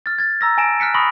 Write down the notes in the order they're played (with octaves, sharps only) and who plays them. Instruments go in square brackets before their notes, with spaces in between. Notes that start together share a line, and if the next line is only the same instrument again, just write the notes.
[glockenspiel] F6 A6
G#6 A6
A#5 E6 A#6
G#5 A5 A#6 D7 E7
F6 F#6 B6 C#7
B5 C#6 D#6 A#6 F#7